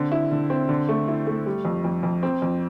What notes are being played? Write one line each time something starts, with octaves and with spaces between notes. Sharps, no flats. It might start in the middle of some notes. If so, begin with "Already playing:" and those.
Already playing: D3 C4
E4
D3
C4
D3
A3
E4
A3
G3
F2
F2
F2
C4
F2